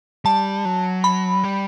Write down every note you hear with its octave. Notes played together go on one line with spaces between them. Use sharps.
G3 A5
F#3
B5
G3